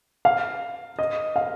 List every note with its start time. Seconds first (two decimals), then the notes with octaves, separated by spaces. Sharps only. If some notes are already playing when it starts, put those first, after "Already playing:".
0.25 F5
0.99 D#5
1.36 F5